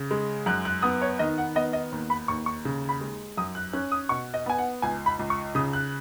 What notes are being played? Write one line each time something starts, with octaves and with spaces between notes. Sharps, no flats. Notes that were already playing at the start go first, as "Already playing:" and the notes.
Already playing: C#3
G#3
F#2 F#6
F#6
B3 D#6
C#5
D#3 D#5
F#5
B3 D#5
D#5
D#2
B5
D#2 C#6
C#6
C#3
B5
G#3
F#2 D#6
F#6
C#4 F#6
D#6
B2 C#6
D#5
B3 G#5
F#5
C#2 G#5
B5
C#2
C#6
C#3 D#6
F#6